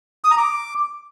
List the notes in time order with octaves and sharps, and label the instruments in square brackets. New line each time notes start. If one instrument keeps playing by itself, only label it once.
[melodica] D#6
A#5
D6